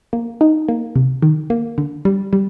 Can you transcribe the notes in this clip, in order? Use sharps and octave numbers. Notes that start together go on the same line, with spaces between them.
A#3
D#4
A#3
C3
D#3
A#3
D3
G3
G3